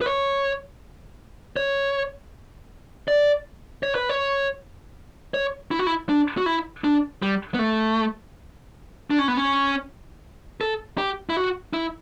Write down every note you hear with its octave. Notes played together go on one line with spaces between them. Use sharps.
B4
C#5
C#5
D5
C#5
B4
C#5
C#5
E4
F#4
E4
D4
F#4
E4
D4
G3
B3
A3
D4
C#4
B3
C#4
A4
G4
E4
F#4
E4